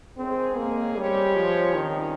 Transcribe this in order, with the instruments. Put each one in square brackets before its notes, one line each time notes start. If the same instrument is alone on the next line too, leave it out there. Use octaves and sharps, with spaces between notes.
[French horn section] F2 D#3 G#3 C#4 G#4 [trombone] C4
[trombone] A#3
[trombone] G3 [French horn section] G#3 C4 G4 C#5
[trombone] F3
[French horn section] C3 G3 C#4 [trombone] D#3